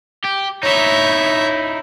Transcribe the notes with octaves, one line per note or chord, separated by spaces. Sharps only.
G4
D#4 E4 C#5 E5